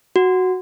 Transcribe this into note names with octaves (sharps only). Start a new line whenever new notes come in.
F#4